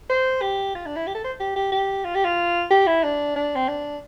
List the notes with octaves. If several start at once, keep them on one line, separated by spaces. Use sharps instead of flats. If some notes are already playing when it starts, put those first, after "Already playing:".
C5
G4
F4
D4
E4
G4
A4
C5
G4
G4
G4
F4
G4
F4
G4
E4
D4
D4
C4
D4